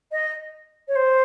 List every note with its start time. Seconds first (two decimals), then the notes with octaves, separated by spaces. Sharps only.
0.12 D#5
0.88 C#5
0.95 C5